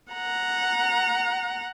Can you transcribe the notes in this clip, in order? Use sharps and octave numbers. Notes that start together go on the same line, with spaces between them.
F#5 A#5